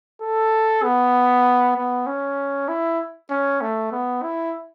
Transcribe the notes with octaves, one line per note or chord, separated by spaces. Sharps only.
A4
B3
B3
C#4
E4
C#4
A3
B3
E4